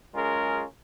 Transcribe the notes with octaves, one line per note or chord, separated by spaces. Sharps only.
F#2 G#3 C#4 F4 G#4 A#4